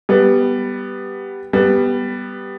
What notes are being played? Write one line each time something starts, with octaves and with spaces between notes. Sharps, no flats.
G3 B3
G3 B3